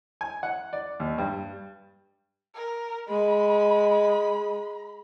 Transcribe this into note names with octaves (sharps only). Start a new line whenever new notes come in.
G#5
F#5
D5
D#2
G2
A#4
G#3 B5